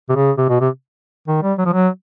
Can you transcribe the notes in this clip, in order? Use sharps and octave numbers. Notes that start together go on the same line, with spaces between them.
C3
C#3
C3
B2
C3
D#3
G3
F#3
F3
F#3